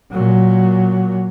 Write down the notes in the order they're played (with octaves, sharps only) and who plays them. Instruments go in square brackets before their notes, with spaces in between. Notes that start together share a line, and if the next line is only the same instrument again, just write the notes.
[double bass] A#2 F#3